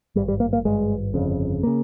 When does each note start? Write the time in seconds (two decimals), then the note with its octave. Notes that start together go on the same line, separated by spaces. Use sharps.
0.15 G#1 G2 G3
0.28 G3
0.40 A#3
0.53 A#3
0.65 G#1 G2 G#3
1.14 G1 F2 C#3
1.63 C#3 A#3